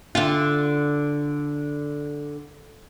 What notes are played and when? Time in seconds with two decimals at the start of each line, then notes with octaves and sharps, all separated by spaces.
0.15 D3 F4